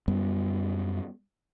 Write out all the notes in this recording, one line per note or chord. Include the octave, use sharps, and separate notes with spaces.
F#2 G3 B3